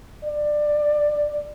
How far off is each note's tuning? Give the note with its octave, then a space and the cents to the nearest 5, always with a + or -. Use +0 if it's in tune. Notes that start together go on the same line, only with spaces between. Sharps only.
D5 +15